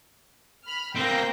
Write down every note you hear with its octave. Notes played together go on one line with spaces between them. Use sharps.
B5 F6
A#3 C4 G5 G6 A#6